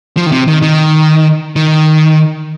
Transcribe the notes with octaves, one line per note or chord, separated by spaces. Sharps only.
F3
D#3
C3
D#3
D#3
D#3